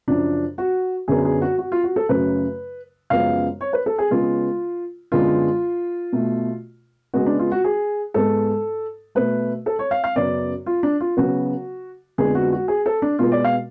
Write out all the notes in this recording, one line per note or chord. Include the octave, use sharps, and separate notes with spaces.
F#2 C#3 F3 D4
F#4
F#2 D3 F#3 B3 G#4
G#4
F#4
F#4
F4
F#4
A4
F#2 C#3 F#3 A3 B4
F#2 C#3 F3 G#3 B3 F5
C#5
B4
A4
G#4
C#3 G#3 B3 F4
F#2 D3 G#3 B3 F4
B2 A3
C#3 G#3 B3 F#4
D4
F4
F#4
G#4
G#2 G#3 B3 A4
B2 A3 B4
A4
C#5
F5
F5
F#2 C#3 F#3 B3 D5
F4
D4
F4
C#3 F#3 B3 F#4
F2 D3 G#3 B3 G#4
F#4
F#4
G#4
A4
D4
B2 G#3 B3 F4
D5
F5